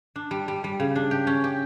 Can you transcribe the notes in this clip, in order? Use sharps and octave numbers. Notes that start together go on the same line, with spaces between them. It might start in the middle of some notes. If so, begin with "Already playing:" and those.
D4
G3
G3
G3
C#3
D4
G4
C#4
G4